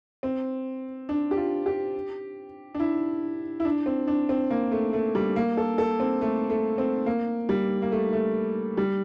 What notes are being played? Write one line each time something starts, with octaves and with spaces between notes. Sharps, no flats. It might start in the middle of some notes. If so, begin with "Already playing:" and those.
C4
D4
G4
F4
G4
D4
E4
E4
D4
C4
D4
C4
A#3
A3
A3
G3
A#3
A4
A4
C4
A3
A3
C4
A#3
G3
A#3
A3
A3
G3